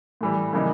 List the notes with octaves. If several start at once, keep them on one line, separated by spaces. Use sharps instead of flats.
A2 E3 G3
C#3 E3 G3 A#3 D#4